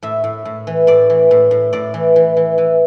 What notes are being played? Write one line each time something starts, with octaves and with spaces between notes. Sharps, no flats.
A2 E5
A2
A2
E3
A2 D5
E3
A2
A2
A2 D5
E3
E3
E3
E3